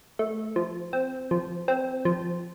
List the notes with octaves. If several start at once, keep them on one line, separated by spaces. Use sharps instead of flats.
A3
F3
C4
F3
C4
F3